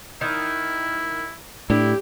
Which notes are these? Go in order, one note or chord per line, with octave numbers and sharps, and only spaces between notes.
D#3 E4
A2 D4 E4 G4